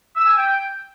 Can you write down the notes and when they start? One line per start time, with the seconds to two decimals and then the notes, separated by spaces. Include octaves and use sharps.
0.16 E6
0.26 G#5
0.37 G5